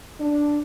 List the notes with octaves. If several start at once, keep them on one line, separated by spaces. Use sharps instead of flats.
D4